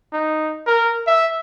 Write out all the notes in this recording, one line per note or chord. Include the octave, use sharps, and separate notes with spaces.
D#4
A#4
E5